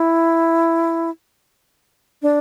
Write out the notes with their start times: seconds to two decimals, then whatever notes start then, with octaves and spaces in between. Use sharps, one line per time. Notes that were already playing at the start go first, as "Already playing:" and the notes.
Already playing: E4
2.22 D4